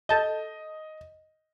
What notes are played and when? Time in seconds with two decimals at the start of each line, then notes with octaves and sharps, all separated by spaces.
0.09 A4 D#5 A5 G6